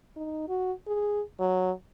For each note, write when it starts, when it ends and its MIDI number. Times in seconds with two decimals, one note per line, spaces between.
0.16 0.45 63
0.48 0.72 66
0.87 1.22 68
1.40 1.71 54